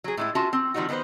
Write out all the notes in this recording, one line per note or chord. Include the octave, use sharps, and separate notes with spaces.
F#3 G#4
A2 G#3 E4
C#4 F4 F#4 E5 A5
C4
D#3 F3 G3 D#4 F#4
D#3 B3 F4 B4 C5